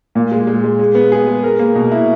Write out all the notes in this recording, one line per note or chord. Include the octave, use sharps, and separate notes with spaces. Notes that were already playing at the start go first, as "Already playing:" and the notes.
A#2
G#3
G#3
G#3
G#3
B3
G#4
G#3
A#4
A#3
B2
E4